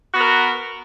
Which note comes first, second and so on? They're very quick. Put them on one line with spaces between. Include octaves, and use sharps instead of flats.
F#4 B3 A#4